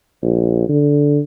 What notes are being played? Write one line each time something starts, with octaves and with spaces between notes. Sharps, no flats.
A#1
D3